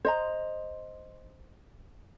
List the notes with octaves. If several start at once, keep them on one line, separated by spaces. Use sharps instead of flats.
C5 D#5 A#5